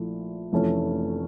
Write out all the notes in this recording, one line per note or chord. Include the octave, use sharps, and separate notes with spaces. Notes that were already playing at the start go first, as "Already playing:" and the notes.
Already playing: A#1 A#2 A3 E4
F1 F2 E3 A3 C#4